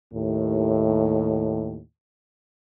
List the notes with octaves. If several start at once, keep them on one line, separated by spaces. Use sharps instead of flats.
D#2 A2